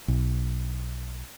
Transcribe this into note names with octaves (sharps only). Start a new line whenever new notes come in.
B1